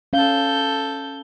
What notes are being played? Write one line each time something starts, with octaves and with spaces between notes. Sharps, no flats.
C#4 A4 F5 G6